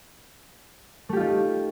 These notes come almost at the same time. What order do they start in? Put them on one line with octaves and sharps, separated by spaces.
A3 G4 F4 D#4